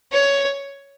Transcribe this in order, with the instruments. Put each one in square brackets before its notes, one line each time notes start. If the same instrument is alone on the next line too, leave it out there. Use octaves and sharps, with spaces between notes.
[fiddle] C#5